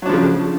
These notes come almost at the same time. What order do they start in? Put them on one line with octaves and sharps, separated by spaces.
F#3 D4 F3 C#3